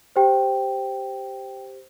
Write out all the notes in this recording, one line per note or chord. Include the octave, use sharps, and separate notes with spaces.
G4 C5 G5